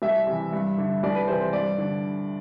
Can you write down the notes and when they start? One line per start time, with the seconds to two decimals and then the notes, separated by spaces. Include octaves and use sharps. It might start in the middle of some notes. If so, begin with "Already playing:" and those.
0.02 C2 E5
0.27 C3 E3
0.53 G2
0.78 D3
1.03 C2 D5
1.15 B4
1.28 C3 E3 C5
1.41 C5
1.53 G2 D5
1.78 D3